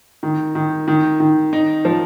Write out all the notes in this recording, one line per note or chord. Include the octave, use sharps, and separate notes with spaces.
D#3
D#3
D#3
D#3
D#4
F3